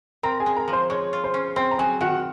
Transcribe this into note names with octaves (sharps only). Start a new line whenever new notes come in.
C4 A#4 A#5
G#4 G#5
G#3
A#4 A#5
F3
C5 C6
G#3 C#5 C#6
F4
C5 C6
C#4
C4 C5 C6
A#5
F#3 G#4 G#5
D#3 F#4 F#5